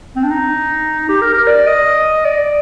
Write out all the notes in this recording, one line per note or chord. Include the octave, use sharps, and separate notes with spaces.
C4
D4
D#4
G4
A#4
A#4
D5
D#5
D5